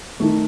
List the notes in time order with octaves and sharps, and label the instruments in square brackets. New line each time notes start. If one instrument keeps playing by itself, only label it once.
[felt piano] D#3 A3